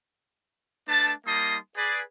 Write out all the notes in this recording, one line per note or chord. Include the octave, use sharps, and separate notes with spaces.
A3 D4 B4 A5
G3 A#3 D#4 A5 C6 D#6
G#4 B4 D5